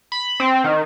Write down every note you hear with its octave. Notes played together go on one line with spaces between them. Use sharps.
B5
C4
D#3